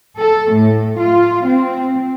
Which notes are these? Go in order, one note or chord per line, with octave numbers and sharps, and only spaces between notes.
A4
A2
F4
C4